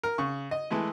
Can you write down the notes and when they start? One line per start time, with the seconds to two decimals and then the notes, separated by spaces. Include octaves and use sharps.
0.03 A#4
0.18 C#3 C#6
0.51 D#5
0.71 E3 G#3 A3 E4